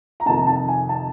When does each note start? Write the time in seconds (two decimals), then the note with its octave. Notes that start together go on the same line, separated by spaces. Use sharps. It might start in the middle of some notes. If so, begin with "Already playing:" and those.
0.20 A#5
0.26 F2 C3 D#3 A5
0.47 A5
0.68 G#5
0.89 A5